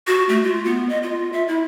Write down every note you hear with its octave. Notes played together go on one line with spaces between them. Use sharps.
F#4
A3
F4
B3
D#5
F4
E5
E4